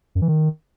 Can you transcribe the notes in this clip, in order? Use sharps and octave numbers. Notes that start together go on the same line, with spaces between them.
F#2
E3
D#3